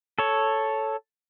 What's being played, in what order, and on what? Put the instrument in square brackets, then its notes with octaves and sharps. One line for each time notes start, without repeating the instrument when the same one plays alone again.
[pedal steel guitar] A4 C#5